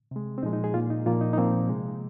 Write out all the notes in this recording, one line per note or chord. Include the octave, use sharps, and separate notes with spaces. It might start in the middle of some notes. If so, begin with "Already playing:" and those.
C3 G#3
C4
A#2 F3 G#3 D#4
D#4
G#4
A#2 A#3 F4
D#4
A#2 F3 A#3 F4
D#4
D#4
A#2 F3 A#3 C4
C3 G#3